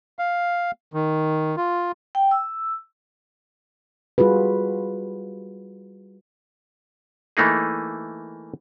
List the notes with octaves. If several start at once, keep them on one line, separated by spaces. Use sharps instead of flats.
F5
D#3
F4
G5
E6
G3 F4 F#4 G#4 B4
E3 A3 A#3 D#4 G#4